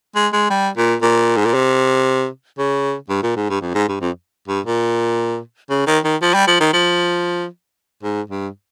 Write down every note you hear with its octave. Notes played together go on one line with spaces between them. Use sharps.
G#3
G#3
G3
A#2
A#2
G#2
A#2
C3
C#3
G2
A#2
G#2
G2
F2
G#2
G2
F2
G2
A#2
C#3
D#3
D#3
F3
G3
F3
D#3
F3
G#2
G2